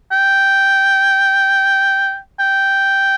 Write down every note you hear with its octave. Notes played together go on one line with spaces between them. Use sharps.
G5
G5